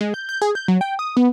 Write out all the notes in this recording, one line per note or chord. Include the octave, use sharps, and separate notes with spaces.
G#3
G6
G6
G#4
G6
F#3
G5
D#6
B3